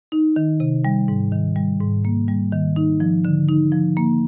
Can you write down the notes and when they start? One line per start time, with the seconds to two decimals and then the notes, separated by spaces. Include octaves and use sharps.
0.12 D#4
0.36 D#3
0.60 C3
0.85 G3
1.08 G#2
1.32 D#3
1.56 G3
1.80 G#2
2.05 A#3
2.28 G3
2.53 D#3
2.76 D#4
3.00 F3
3.25 D3
3.49 D#4
3.72 F3
3.97 A#3